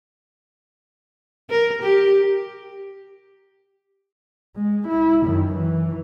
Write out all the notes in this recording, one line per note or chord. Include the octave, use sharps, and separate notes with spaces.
A#4
G4
G#3
E4
F#2 D#3
E3